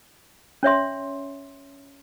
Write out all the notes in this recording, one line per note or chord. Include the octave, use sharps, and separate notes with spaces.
C#4 C#5 E5 C6